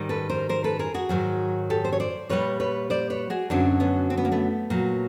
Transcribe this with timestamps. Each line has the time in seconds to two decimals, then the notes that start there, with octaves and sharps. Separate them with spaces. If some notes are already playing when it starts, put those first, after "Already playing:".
Already playing: G#2 D#3 G3
0.09 A4 B4
0.30 A#4 C5
0.49 A#4 C5
0.64 A4 B4
0.79 G#4 A#4
0.94 F#4 G#4
1.09 G#2 D#3 F#3
1.70 G4 A4
1.85 C5
1.93 C#5
2.00 C5 D5
2.29 A#2 G3 B4 C#5
2.60 B4 C#5
2.90 C5 D5
3.10 B4 C#5
3.30 F#4 G#4
3.50 F#2 D3 F#3 C4 D4
3.80 B3 C#4
4.10 C4
4.18 B3
4.25 A#3
4.32 A3 B3
4.70 A#2 F#3